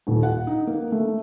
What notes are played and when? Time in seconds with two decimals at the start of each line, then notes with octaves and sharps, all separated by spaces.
0.07 D#1
0.23 F#5
0.47 D#4
0.67 A#3
0.92 A3